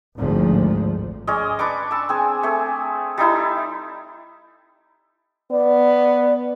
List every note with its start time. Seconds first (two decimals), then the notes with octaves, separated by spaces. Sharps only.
0.17 G#1 D2 G#2 F3
1.27 G#3 C#4 D5 D#5
1.59 D4 B4 C#6 D6
1.91 A5 E6
2.09 C4 G#4 G#5
2.43 A3 C4 G#4
3.18 G3 D#4 E4 A5
5.51 B3 D5